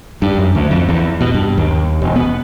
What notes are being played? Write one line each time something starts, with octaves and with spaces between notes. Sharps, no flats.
G2
F#2
D2
F2
E2
B2
G2
D#2
E1
B3